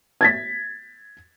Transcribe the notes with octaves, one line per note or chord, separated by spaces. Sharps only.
G#6 A6 B6